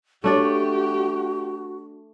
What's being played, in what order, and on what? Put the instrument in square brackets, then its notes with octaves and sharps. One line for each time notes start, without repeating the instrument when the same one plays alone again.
[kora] A3 D4 D5 [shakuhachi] F#4 [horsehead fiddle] G4